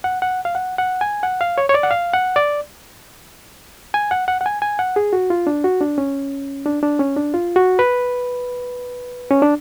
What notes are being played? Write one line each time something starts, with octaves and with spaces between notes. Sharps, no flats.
F#5
F#5
F5
F#5
F#5
G#5
F#5
F5
C#5
C#5
D5
F#5
F5
F#5
D5
G#5
F#5
F#5
F#5
G#5
G#5
F#5
G#4
F#4
F4
D4
F#4
D4
C#4
D4
D4
C#4
D4
F4
F#4
B4
C#4
D4